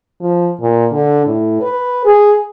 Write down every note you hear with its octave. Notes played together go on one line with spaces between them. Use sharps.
F3
A#2
D3
A2
B4
G#4